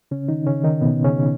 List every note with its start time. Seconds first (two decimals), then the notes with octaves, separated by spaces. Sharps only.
0.11 C#3 C#4
0.28 D#3 D#4
0.47 C#3 C#4
0.64 D#3 D#4
0.81 B2 B3
1.05 C#3 C#4